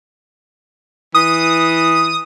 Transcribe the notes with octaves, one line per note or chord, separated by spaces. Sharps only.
E3 D#6